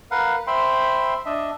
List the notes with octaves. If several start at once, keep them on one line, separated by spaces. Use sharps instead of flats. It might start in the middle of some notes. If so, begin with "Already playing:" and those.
A#4 B4 F5 F#5
C5 E5 G5 B5 C6
D4 D#5 E5